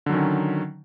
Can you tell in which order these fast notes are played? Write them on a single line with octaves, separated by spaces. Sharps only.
D3 F#3 D#3 C#4